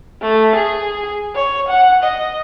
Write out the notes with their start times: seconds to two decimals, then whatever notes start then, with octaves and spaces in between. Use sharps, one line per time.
0.22 A3
0.55 G#4
1.35 C#5
1.68 F#5
2.04 D#5